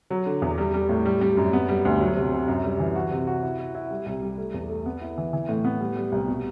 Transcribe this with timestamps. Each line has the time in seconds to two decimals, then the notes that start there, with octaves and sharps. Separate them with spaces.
0.10 F#3
0.26 D3
0.42 E2
0.58 G3
0.74 G3
0.89 A2
1.06 G3
1.21 G3
1.37 F#2
1.53 B3
1.69 G3
1.85 D2
2.00 F#3
2.16 C3
2.32 C3
2.48 F#2
2.64 G3
2.80 E3
2.96 F#4
3.11 C3
3.27 F#4
3.43 E4
3.59 E4
3.75 E4
3.90 G3
4.06 C2
4.22 G3
4.38 A3
4.54 E2
4.69 A3
4.86 B3
5.01 E4
5.18 E3
5.33 E3
5.49 A2
5.65 B3
5.81 G3
5.96 G3
6.12 C2
6.28 B2